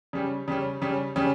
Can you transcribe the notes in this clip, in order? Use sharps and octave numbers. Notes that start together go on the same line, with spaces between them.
C#3 G3 C#4
C#3 G3 C#4
C#3 G3 C#4
C#3 G3 C#4